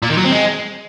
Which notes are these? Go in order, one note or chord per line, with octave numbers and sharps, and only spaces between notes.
A#2
D#3
F#3
C4
G#3